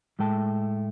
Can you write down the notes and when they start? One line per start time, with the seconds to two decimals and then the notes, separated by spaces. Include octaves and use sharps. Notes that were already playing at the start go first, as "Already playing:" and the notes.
0.19 A2 G#3 A3 G5 A5